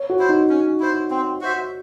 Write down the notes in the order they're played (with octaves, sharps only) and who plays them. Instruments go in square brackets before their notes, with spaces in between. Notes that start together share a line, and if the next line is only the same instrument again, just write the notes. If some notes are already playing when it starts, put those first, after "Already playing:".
Already playing: [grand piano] C#5
F#4
[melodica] E4 C5
[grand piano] D#4
[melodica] C#4
E4 C5
C4
F#4 C5 E5